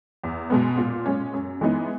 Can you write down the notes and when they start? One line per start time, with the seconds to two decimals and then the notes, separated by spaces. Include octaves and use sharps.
0.24 E2
0.50 B2 G#3 B3
0.77 A#2
1.06 G#3 C#4
1.33 F#2
1.61 E3 G#3 B3 D#4